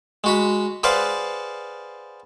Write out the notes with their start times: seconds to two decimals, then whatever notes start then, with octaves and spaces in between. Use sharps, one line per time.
0.24 G#3 F#4 B5
0.83 G#4 B4 C5 D5 F5 F#5